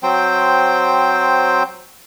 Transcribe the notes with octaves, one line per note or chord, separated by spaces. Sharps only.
F#3 C4 C5 G5